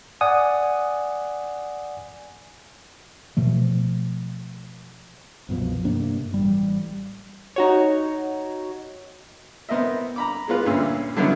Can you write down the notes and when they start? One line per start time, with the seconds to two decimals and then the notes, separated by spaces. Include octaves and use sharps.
0.21 D5 F#5 G#5 D#6
3.37 B2 F3 A3
5.49 C2 F#2 B2 F3
5.84 G2 C3 A#3 D4
6.34 A1 G3
7.56 D#4 F#4 C#5
9.69 B3 C4 A#4 D#5 E5
10.16 A#5 B5 D6
10.48 G#3 B3 F4 B4
10.66 D2 G2 A#2 C#4 E6
11.17 D3 D#3 F#3 B3 C#4 E4